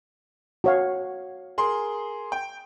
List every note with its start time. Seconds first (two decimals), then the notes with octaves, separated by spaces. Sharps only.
0.64 F#4 C#5 F5
1.58 G#4 A#4 C6
2.32 G5